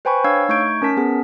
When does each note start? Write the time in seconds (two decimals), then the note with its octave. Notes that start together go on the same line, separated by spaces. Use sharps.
0.05 B4 C5 G5 G#5 B5 C#6
0.24 D4 C#5 F5 E6 G#6
0.49 A3 D#4 C#6 G6 G#6 D7
0.82 C#4 A#4 A5 B6
0.97 B3 G#4